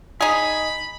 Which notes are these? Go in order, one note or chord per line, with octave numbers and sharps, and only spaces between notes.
D#4 G#4 B5